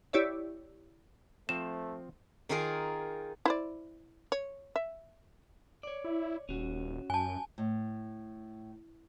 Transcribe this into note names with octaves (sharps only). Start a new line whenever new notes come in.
E4 G4 C#5 D5 E5
F3 A3 C4 E7
D#3 D#4 F4 G#4 A#4
E4 C5 D5
C#5
E5
C#5 D5
E4
D#1 C#4 F#4
F#2 G#5 A5
A2